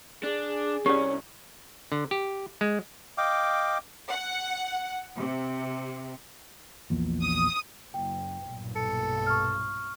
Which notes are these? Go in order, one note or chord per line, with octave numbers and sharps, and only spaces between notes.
D4 G#4
C2 C#4 G4 D5
D3
G4
G#3
D#5 F5 G5 D6
F#5
C3
A#1 E2 A#2
D#6
F#1 G5
B1 G2 A#2
A4 C#7
C#6 F6